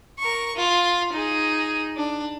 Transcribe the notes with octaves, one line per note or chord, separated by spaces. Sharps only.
A#4 C#6
F4
D#4 G#4
D4